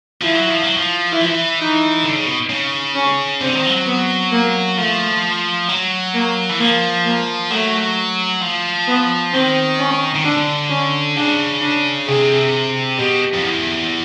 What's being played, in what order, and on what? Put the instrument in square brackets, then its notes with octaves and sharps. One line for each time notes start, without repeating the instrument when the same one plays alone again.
[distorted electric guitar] F3 [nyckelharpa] E4
[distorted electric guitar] F#3
F3
F#3
F3
[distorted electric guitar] E3 [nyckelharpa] E4
[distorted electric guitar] F3
E3
[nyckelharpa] D#4
[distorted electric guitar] D3
C#3
B2
C#3
[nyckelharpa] C#4
[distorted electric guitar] D3 [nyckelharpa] C4
[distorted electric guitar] D#3
F3
F#3
[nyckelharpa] B3
A#3
[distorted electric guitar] F3 [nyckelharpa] A3
[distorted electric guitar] F#3
[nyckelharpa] A#3
[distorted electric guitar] E3
[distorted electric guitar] F3 [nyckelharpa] A#3
[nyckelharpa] A#3
[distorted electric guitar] F#3 [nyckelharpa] A3
[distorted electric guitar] F3
[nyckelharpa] B3
[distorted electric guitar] D#3 [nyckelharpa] C4
[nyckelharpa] C#4
[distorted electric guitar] D#3
[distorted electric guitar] D3 [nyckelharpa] D4
[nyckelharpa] C#4
[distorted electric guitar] C#3 [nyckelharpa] D4
[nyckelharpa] D4
[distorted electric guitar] C3 [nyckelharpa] G#4
[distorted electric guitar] B2 [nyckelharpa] G4
[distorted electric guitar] F2
E2